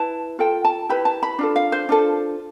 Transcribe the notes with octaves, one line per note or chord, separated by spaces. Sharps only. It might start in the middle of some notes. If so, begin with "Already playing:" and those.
Already playing: E4 B4 A5
F4 A4 G5
A5
E4 G4 B4 B5
A5
B5
D4 F4 A4
F5
C5
D4 F4 A4